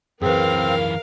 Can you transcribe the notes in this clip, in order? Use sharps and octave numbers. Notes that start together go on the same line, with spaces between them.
F#2 E3 C4 G#4 A#4 B4 F5